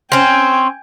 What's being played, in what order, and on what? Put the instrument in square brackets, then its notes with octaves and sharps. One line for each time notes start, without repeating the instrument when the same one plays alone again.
[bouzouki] C4 C#4 [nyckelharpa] G5 G#5